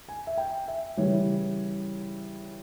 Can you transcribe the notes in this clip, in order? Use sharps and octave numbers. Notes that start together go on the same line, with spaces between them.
G#5
E5
G5
E5
C#3 E3 G3 C#5